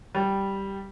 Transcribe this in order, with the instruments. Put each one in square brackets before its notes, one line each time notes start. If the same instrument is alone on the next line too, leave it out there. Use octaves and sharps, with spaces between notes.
[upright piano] G3